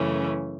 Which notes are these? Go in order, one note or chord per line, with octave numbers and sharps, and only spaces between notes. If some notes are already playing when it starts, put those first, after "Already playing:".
Already playing: F#2 C#3 E3 A3 C#4